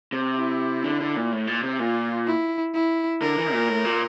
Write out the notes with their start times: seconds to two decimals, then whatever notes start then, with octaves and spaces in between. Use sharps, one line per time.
0.12 C3
0.36 E4
0.84 D3
1.00 D3
1.16 A#2
1.32 A2
1.47 A#2
1.63 C3
1.79 A#2 F4
2.27 E4
2.74 E4
3.22 D3 A#4
3.38 E3
3.53 A#2
3.69 A2
3.85 A#2